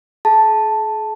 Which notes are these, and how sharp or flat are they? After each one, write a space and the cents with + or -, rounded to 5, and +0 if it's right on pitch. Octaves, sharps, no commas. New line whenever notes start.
G#4 +40 A5 +0